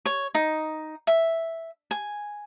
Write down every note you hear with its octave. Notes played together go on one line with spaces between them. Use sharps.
C#5
D#4
E5
G#5